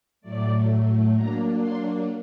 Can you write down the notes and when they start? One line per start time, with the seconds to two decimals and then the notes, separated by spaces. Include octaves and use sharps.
0.21 A2 F#3 A3 D5
1.14 F#3 A#3 D4 A#5
1.60 C6